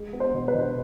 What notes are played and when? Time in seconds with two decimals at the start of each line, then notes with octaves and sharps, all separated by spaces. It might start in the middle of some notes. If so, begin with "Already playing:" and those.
Already playing: G#3
0.13 B3
0.20 C5
0.34 B2
0.48 B4
0.55 B2